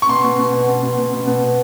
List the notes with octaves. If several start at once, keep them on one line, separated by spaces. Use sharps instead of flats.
C#6
B2 C6
B2
B2
B2
B2
B2
B2
B2
B2
B2